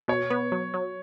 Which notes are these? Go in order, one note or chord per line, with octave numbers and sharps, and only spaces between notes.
B2 C#5
B3
F#3
F#3